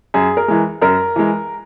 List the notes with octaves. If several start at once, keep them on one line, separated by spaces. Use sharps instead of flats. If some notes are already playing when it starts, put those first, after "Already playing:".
F#2 G#4
A#4
E3 G#3
F#2 A#4
E3 G#3